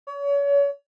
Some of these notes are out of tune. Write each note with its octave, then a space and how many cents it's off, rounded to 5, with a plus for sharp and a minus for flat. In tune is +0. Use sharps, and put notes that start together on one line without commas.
C#5 +35